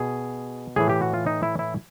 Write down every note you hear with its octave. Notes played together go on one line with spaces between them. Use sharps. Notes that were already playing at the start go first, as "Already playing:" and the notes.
Already playing: B2 G#4
A2 E3 G#4
G4
F#4
F4
D#4
E4
E4